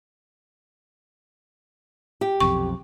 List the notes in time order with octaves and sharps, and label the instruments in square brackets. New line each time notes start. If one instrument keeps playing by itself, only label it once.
[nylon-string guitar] G4
[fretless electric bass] B1 F2 C3 [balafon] C#6